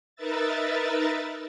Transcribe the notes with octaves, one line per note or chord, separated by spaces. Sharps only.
D#4 A#4 B4 E5 A6